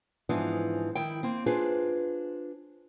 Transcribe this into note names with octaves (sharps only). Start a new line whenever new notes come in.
G#2 E3 F3 B3 D4 D#4
D#3 E4 G5
A#3 C4
D4 F4 G#4 B4 C5